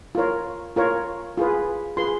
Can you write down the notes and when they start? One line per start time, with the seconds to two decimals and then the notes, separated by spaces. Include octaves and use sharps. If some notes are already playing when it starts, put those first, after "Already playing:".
0.15 F4 A#4 C#5
0.76 F4 A#4 C#5
1.37 F4 G#4 B4
1.97 F4 G#4 B4 C6